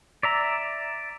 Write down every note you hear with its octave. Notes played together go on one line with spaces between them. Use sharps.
D5 E5 A#5